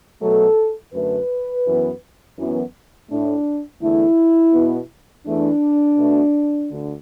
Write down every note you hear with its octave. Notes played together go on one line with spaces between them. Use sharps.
B2 F#3 A3 A4
F#2 D3 A3 B4
F#2 E3 B3
F#2 E3 B3
A2 A3 D4
E2 D3 A3 E4
B2 B3
E2 E3 A3 D4
B2 A3
D2 D3